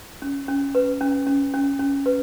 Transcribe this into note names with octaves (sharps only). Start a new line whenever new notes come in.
C#4
C#4
B4
C#4
C#4
C#4
C#4
B4